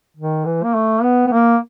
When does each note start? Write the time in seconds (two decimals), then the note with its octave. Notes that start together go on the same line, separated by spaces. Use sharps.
0.17 D#3
0.45 E3
0.64 A#3
0.74 A3
1.02 B3
1.27 B3
1.31 A#3